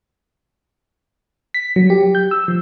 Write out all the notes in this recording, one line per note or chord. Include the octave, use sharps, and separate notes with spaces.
B6
F#3
G4
G6
E6
F3